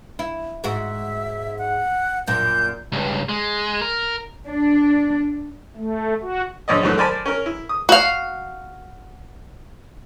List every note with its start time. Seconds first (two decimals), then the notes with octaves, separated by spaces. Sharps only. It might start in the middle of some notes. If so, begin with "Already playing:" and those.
0.19 E4
0.64 G#2 F#4 E5
1.58 F#5
2.27 F#2 A#2 G6
2.92 C#2 G2
3.29 G#3
3.81 A#4
4.47 D4
5.76 A3
6.22 F#4
6.68 A#1 F#2 D5 D#5
6.83 D2 G#2 E3 F#3 A3
6.97 A#4 C5 D5 G#5 A5 B5
7.26 C#4 A#4
7.46 E4
7.69 D#6
7.89 F#4 F5